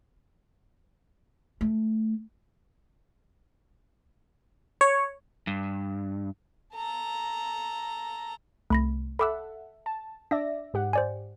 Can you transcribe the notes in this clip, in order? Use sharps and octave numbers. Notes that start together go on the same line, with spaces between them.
A3
C#5
G2
A4 A#5
C2 A3 B5 A#6
A4 E5 F#5 B5 D6 E6
A5
D4 D5 E5 A#6
G#2 G4 F#5
C5 D5 G#5